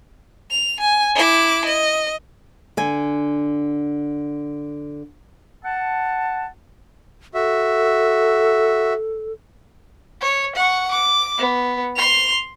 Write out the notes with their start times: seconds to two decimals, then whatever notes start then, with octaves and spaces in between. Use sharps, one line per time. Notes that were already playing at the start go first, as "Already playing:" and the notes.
0.50 F7
0.81 G#5
1.15 E4 D6
1.66 D#5
2.77 D3 G#5
5.64 F#5 A5
7.34 F#4 A4 E5
10.21 C#5
10.55 F#5 C#6
10.91 D6
11.38 B3
11.96 C6 F7